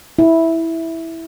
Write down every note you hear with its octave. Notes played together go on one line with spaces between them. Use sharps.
E4